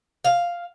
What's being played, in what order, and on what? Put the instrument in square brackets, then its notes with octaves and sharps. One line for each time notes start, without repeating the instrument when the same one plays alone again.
[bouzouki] F5